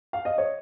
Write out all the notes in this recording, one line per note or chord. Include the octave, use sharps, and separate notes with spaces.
F5
D#5
C#5